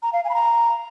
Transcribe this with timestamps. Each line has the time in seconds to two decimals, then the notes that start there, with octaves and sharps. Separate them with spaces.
0.03 A#5
0.13 F5
0.25 G#5
0.29 B5
0.34 A#5